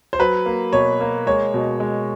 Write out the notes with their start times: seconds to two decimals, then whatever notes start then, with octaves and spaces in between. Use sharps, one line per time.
0.13 C5
0.19 F#3 B4
0.46 A#3
0.73 B2 C#5
1.00 A#3
1.26 G#3 C#5
1.54 B2
1.80 G#3